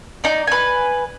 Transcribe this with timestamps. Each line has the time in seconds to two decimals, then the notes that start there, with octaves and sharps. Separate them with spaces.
0.24 D#4 D5
0.47 B4 G#5